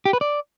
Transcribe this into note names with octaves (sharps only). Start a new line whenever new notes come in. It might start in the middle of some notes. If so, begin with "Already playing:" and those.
G4
B4
D5